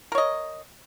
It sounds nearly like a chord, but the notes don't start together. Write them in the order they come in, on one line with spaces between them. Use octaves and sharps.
A#4 C#5 D#5